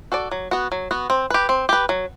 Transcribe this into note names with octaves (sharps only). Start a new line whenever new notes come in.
F#4 A4 D5
F#3
B3 F#4
F#3
B3 F#4
C4
G4 B4
C4
G4 B4
F#3